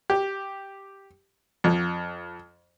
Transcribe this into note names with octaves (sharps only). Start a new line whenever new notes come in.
G4
F2